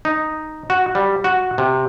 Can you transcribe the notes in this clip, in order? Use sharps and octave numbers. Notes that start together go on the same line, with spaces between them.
D#4
F#4
G3
F#4
C3